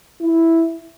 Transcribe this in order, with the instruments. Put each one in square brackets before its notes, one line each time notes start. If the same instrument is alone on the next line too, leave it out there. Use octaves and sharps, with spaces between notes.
[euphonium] E4